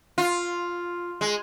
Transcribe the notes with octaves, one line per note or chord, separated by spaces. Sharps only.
F4
G#3